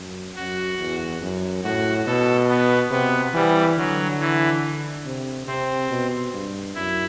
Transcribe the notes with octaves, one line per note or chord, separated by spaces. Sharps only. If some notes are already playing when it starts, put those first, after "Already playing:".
Already playing: F#2
F#2 F#4
E2
F#2
A2 F#4
B2 A4
B3
C3 B3
E3 G3
D3 F#3
E3
C3
C3 C4
B2
G2
F#2 E4